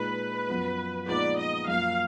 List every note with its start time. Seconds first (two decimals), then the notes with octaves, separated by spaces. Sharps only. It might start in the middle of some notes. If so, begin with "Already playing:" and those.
Already playing: A#2 G#3 D#4 B4
0.49 F#2 F3 B3 F4
1.08 A#2 F3 G#3 B3 D#4 D5
1.38 D#5
1.67 F#2 F3 A#3 F5